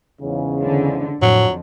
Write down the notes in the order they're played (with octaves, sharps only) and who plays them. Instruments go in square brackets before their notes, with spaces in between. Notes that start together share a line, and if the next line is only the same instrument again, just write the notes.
[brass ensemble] E2 G#2 C#3
[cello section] D3
[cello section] F2 [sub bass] A2 [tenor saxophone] F#3